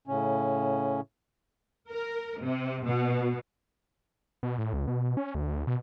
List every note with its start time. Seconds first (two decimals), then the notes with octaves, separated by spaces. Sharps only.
0.07 A2 C#3 C#4
1.88 A#4
2.38 C3
2.84 B2
4.43 B2
4.58 A2
4.73 C#2
4.88 B2
5.17 C#4
5.35 D2
5.47 D2
5.67 B2